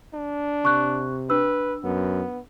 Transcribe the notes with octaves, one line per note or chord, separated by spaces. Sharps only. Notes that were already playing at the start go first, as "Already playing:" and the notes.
D4
C3 C#6 F#6
D4 B4 E6
F#2 B3